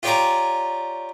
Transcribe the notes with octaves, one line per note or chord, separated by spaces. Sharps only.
F4 G4 C#5 D5 G#5 A#5